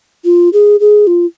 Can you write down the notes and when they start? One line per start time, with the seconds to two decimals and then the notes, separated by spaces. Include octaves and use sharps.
0.25 F4
0.53 G#4
0.80 G#4
1.07 F4